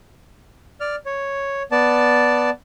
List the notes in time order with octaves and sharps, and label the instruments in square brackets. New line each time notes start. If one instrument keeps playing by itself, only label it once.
[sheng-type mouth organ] D5 F6
C#5
B3 D5 A5